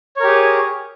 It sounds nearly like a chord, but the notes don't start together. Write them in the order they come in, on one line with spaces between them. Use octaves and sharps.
C#5 A#4 G4 G#4